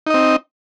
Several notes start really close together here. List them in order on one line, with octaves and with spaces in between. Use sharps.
D#4 D#5 C4